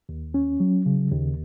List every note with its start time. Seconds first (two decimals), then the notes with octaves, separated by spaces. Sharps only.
0.09 D#2
0.34 C#4
0.60 F#3
0.86 C#3
1.11 D#2